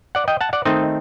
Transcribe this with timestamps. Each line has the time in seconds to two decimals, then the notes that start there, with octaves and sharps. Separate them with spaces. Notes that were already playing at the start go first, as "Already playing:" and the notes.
0.15 D5 F#5
0.28 D#5 G5
0.41 F#5 A5
0.53 D5 F#5
0.65 D#3 A3 C4 D#4 C5 D#5